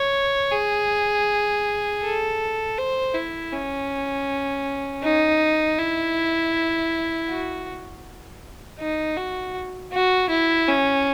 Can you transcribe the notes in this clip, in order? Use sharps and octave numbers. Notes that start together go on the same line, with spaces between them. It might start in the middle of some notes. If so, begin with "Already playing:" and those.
Already playing: C#5
G#4
A4
C5
E4
C#4
D#4
E4
F#4
D#4
F#4
F#4
E4
C#4